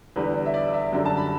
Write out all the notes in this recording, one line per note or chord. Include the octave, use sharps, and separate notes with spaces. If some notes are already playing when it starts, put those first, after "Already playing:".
E2 D3 G3 B4
E5
D5
E5
F#2 D3 G3
A5
B5